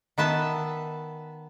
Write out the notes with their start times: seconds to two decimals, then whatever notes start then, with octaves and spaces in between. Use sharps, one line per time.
0.18 D#3 B3 E5 A5